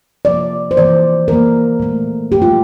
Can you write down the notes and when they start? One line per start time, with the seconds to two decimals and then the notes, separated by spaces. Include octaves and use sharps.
0.25 C3 F3 A#3 D5
0.71 C5
0.76 E3 A#3 D5
1.28 E3 A#3 A#4
1.80 A#2 A3
2.32 A#2 A3 G4
2.42 F4